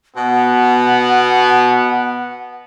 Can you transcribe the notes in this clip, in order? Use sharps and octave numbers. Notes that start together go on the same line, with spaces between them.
B2 B3 F#5